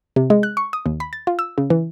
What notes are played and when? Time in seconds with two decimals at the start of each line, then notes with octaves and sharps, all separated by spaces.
0.16 C3
0.30 G#3
0.43 F#6
0.57 C#6
0.73 D#6
0.86 D#2
1.00 B5
1.13 A6
1.27 F4
1.39 E6
1.58 C#3
1.70 E3